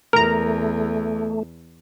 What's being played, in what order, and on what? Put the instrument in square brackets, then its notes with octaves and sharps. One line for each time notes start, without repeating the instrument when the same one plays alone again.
[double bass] E2 [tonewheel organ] A3 [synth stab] A#4 A#5